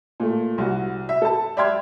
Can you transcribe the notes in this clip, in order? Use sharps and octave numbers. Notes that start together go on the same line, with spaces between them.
A#2 A3
C2 F#4
E5
A4 A5
D5 E5 G5 C6 F6 G#6